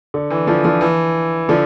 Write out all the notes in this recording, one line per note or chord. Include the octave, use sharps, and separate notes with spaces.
D3
E3
D3 F3
D3 F3
E3
D3 F3